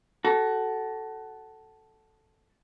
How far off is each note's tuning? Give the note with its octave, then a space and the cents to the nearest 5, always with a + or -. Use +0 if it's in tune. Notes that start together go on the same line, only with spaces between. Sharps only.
F#4 +25 A4 -5